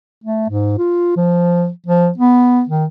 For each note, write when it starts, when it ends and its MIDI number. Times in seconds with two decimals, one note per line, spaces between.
0.24 0.45 57
0.49 0.76 44
0.78 1.15 65
1.16 1.69 53
1.86 2.09 53
2.18 2.63 59
2.69 2.85 51